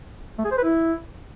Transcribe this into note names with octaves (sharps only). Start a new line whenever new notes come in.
A3
G#4
C5
B4
E4